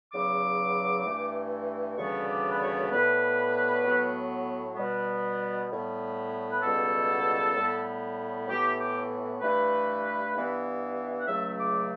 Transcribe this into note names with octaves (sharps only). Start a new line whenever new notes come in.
E2 C#3 F#3 B3 D6
G2 E3 A3
D2 C#3 E3 G3 B3 C#6
D5
B4
C#5
A2 G3 B3 B4
A2 F#3 B3
B2 G3 B3
A2 G3 B3
B4
C#2 B2 G3 B3 A4
A2 G3 B3
A2 E3 B3 G4
G4
G2 E3 A3 B4
G2 E3 B3
F#5
C#2 C#3 F#3 A3 E5
D6